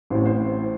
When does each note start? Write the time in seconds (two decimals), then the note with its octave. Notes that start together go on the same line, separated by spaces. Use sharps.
0.10 A1 A2 C5
0.25 C5